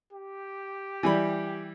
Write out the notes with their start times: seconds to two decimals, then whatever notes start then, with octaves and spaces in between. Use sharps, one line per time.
0.13 G4
1.03 E3 G3 B5